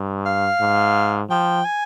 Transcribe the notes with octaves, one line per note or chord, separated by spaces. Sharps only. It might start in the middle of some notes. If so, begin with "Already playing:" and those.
Already playing: G2
F5
G#2
F3 G5
G#5